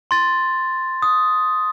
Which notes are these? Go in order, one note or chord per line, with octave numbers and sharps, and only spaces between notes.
C6 A6
D#6